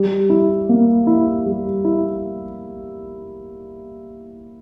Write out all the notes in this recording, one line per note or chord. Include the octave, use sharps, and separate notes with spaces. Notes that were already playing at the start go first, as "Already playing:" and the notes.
Already playing: G3
E4
A#3
E4
G3
E4